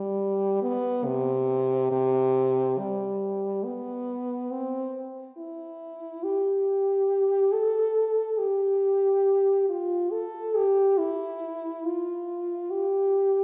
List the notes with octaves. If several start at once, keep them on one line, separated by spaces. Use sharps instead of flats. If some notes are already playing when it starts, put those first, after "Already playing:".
Already playing: G3
B3
C3
C3
G3
B3
C4
E4
G4
A4
G4
F4
A4
G4
E4
F4
G4